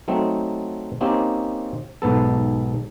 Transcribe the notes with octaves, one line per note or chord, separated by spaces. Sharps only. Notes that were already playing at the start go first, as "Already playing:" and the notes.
F#3 A3 C4 D#4
A#3 C4 C#4 D#4 G4
B1 G#2 B3 A4